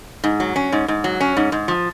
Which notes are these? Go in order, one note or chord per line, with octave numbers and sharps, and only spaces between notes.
G#2
F#3
C#4
G#2
G#2
F#3
C#4
G#2
G#2
F3